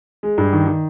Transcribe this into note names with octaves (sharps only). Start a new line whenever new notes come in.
G#3
G2
D#3
D#3